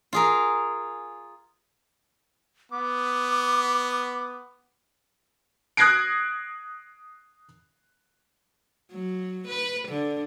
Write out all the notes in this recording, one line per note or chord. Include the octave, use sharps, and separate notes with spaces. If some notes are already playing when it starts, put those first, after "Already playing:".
F4 G#4 A#4
B3 D6
D#6 F#6 G#6 A#6 C7 D7
F#3
B4
D3